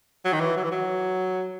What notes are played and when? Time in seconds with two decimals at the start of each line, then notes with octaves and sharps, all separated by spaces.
0.25 F#3
0.33 D#3
0.40 E3
0.56 F#3
0.64 E3
0.71 F#3